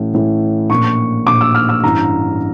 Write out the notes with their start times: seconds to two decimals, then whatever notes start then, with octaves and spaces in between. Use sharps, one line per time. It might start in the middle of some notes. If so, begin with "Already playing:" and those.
Already playing: A1 A2 E3
0.13 A1 A2 E3
0.70 A#1 A#2 C#6
1.27 A#1 A#2 D6
1.41 E6
1.55 F6
1.69 E6
1.83 A1 G2 E3 A#5